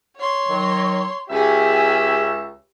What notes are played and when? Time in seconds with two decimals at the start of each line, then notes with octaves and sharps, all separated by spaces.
0.17 C#5 C6
0.48 D#3 F#3
1.30 C#2 C#4 G4 G#4 E5